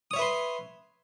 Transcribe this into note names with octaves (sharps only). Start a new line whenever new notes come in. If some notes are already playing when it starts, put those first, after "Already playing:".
B4 C#5 E5 C6 D#6